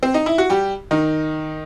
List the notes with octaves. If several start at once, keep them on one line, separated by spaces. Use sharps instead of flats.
C4
D#4
E4
F#4
G3 G4
D#3 D#4